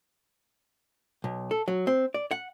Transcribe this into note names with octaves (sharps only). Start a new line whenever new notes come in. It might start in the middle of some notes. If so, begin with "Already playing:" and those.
B1
A4
F#3
C4
D5
F#5